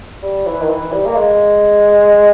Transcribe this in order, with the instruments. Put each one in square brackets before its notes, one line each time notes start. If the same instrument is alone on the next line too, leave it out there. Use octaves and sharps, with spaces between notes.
[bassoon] G3
E3
D#3
E3
G3
A#3
G#3